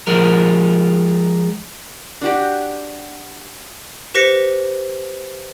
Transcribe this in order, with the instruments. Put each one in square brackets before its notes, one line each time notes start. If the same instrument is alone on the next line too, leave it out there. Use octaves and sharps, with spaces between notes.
[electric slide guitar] F3 G#3 A#4
[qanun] D4 F#4 G4
[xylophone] G4 B4 C5 A#6 B6 C#7